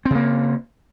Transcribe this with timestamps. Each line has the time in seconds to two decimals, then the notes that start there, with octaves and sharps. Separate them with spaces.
0.05 C4
0.10 C#3
0.15 A#3